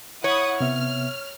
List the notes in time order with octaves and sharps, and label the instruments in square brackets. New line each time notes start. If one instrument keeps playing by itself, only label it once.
[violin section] E4 F#5 D#6 [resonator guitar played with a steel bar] C#5
[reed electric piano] C3 B3 E5 [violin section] F6